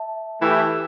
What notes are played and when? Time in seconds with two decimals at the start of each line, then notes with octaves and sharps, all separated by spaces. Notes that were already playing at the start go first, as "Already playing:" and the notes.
Already playing: E5 A5
0.40 E3 A3 E4 G4